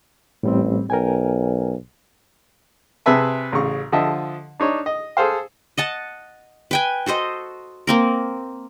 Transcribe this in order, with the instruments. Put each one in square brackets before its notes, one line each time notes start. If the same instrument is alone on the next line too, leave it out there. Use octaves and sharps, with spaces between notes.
[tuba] A1 [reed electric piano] A2 G3 C4
[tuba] B1 [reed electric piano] A#4 G5 G#5
[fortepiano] C3 G#4 B4 E5 A5
A1 C#3 C#6
D3 F3 D#5 E5 A5
D4 D#4 C#5
D#5
G#4 A4 C5 F5
[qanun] D#5 F#5 A5
B4 G5 G#5
F#4 A4 C5 D#5
A#3 C4 A#4